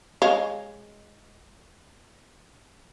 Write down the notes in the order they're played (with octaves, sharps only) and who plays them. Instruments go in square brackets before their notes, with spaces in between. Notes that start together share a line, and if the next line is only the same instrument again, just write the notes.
[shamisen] G#3 C#5 F5